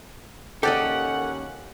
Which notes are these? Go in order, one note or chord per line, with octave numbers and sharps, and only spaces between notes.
D#2 A#3 C#4 G4 A4 D5 D#5 F#5